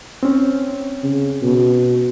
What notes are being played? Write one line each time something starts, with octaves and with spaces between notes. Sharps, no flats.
C4 C#4
C#3
B2